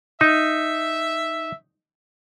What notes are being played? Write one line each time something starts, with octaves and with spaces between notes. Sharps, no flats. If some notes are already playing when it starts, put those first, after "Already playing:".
D#4 E5